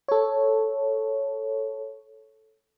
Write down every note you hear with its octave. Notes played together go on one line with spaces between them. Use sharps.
A4 C#5